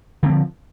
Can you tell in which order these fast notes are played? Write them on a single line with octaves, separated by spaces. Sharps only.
D3 C4 F3